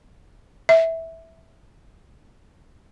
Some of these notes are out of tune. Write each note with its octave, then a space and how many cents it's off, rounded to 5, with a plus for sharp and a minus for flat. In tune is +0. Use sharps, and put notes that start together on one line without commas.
E5 -10